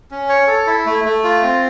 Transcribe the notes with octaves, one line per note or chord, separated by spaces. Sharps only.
C#4
C#5
A4
E4
A3
A3
F4
C4